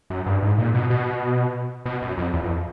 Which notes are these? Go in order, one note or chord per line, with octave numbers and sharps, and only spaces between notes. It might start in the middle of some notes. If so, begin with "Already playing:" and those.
F#2
G2
G#2
A#2
B2
B2
B2
F#2
F2
E2
F2